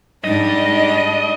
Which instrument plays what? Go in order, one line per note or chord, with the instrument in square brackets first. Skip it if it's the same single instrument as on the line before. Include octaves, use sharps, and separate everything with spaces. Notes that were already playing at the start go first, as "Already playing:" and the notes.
[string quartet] G#2 G3 D4 [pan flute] D#4 [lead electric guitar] D#5